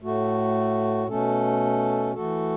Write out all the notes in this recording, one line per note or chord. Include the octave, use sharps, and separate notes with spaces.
A2 A3 F#4
B2 A3 C#4 A4
E3 A3 F#4 A4